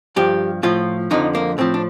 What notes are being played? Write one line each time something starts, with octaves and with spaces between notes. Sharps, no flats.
G2 F3 G4
A2 F3 F4
F2 D3 F3 D#4
A#3
A2 F3 C4
D4